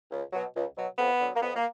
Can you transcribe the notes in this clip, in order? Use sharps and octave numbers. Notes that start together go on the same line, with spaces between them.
C#2
B2 F#3
C#2
B2 F#3
F2 B3
D3 F#3
A#3
F2 B3
A#3